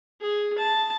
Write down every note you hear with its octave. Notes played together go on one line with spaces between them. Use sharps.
G#4
A5